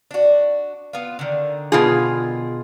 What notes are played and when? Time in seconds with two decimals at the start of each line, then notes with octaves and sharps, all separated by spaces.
0.11 D4 F#4
0.93 B3 F4
1.19 D3 D#3
1.72 B2 F4 G#4